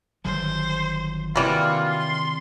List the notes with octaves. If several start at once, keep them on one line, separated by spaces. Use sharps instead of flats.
G1 D#3 F#3 C5
C3 D#3 E3 G3 A#3 C4 F4 F#4
C6